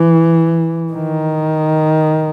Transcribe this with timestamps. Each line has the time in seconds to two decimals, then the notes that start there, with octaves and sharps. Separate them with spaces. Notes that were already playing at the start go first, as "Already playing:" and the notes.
Already playing: E3
0.93 D#3